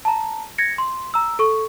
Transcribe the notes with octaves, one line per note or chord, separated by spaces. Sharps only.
A5 A#5
G#6 A#6 C#7
C6
A#5 E6
A4 C#6